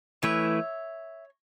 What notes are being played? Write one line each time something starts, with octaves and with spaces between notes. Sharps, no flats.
E3 A3 E4 B4 C#5 E5